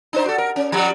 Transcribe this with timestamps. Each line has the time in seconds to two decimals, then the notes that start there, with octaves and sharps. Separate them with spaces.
0.13 D4 D#4 C5
0.26 F#4 A4
0.38 A#4
0.56 C#4
0.72 F3 G3